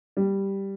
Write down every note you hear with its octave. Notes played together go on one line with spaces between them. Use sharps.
G3